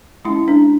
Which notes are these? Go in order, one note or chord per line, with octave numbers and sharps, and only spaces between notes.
G#3 C#4 E4
D4